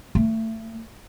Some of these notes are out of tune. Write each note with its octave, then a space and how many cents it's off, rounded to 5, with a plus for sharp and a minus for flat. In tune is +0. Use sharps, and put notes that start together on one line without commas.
A3 +25